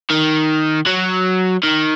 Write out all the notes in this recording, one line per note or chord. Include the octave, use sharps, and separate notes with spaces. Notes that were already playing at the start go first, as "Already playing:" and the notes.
D#3
F#3
D#3